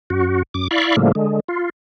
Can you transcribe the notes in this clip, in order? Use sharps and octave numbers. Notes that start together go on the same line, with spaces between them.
F#2 F#4
F#2 D6
E4 D5 F5 B5 C#6
A2 C#3 F3 G3 A3 A#3
D3 G#3
F4